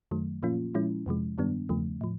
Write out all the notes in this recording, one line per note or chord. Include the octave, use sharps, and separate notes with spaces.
F#2 D#3 F#3 A3
A#2 F3 A#3 C#4 F4
A#2 F3 G#3 C#4 E4
F2 C3 F3 G#3
G2 D#3 G3 B3 D4
E2 C#3 F3 A3
A2 F3